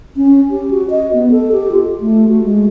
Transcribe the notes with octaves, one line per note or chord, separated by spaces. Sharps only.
C#4
G4
F#4
D#5
B3
A4
G4
F4
A3
F#4
G#3